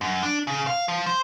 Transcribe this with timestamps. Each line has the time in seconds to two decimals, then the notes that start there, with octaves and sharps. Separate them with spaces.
0.01 F#2
0.23 D4
0.47 C#3
0.67 F5
0.88 F3
1.06 C5